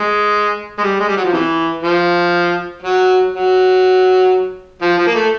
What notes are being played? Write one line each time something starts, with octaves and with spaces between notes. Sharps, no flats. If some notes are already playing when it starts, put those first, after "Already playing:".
Already playing: G#3
G#3
G3
G#3
G3
F#3
F3
C3 E3
F3
F#3
F#3
F3
F3
A#3
A3